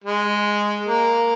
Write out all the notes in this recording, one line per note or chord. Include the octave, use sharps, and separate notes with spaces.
G#3
A#3